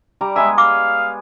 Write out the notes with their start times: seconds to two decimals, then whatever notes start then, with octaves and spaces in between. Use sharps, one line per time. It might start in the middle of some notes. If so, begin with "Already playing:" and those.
0.21 G3 D5 A#5
0.36 G#3 B3 G#4 E5 A#5
0.58 F5 D6